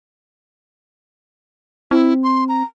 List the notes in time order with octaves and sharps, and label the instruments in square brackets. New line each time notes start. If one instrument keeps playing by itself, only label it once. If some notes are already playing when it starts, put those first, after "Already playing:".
[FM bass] C4 [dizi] E4
[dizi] C6
A#5